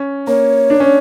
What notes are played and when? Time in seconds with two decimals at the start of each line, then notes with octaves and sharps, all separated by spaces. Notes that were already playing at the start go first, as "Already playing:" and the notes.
Already playing: C#4
0.27 A#3 C#5
0.70 D4
0.80 C#4